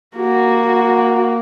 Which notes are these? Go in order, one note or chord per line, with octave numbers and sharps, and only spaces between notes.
A#3 F#4